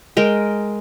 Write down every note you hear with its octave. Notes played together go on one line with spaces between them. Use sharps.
G#3 A#4 G5